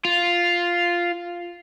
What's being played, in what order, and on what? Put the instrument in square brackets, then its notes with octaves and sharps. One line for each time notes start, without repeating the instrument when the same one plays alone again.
[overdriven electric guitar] F4